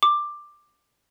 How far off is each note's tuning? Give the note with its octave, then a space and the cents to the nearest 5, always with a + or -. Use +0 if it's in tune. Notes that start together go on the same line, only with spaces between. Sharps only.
D6 +10